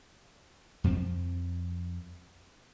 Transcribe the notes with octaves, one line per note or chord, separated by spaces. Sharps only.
F2 F3 C4